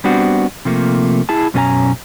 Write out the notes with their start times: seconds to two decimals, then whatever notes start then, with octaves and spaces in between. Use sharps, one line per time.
0.04 G3 B3 C4 D4 F#4
0.65 C3 F3 A3 A#3
1.29 E4 G#4 A5
1.54 F#2 B2 C#4 A4 G#5 A#5